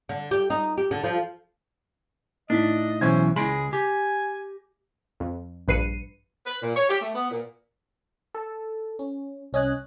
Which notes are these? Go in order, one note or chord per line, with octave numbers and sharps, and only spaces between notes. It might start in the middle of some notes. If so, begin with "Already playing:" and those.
D3
G4
D#4
G4
D3
F3
A2 D4 D#4 D#5 B6
B1 E3 C#4 C5 G#6
C#2 G#3 G#4 B5 C6 A#6 D7
G4 G#5
F2
A#1 G2 B4 C7 C#7 D#7
B4
A#2
C#5
G4
A3
B3
A#2
A4 A5
C#4
C2 C#4 D#5 G#5 F#6